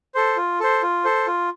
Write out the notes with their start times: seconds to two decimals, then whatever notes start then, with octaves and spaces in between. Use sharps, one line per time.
0.15 A4 C5
0.37 F4
0.60 A4 C5
0.83 F4
1.04 A4 C5
1.27 F4